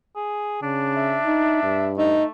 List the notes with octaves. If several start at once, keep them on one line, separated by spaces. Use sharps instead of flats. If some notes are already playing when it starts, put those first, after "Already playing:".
G#4
C#3 D4
E5
D#4
G2
A3 D#4